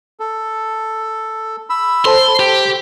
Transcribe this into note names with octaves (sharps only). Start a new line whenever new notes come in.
A4
B5 E6
A4 C5 A5 C6
G4 G5